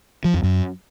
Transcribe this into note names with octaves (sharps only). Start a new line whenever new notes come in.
F3
F2
F#2